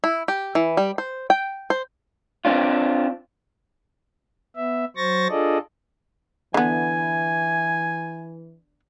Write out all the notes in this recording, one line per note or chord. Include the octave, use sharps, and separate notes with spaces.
E4
G4
E3
G3
C5
G5
C5
C4 D4 F4
B3 E5
F#3 C5 C#6 A6 A#6
D4 F4 G#4 A4 D5 D#5
D3 E3 B3 G#5